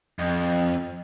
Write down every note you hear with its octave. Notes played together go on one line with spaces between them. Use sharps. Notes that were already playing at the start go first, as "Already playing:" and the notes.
F2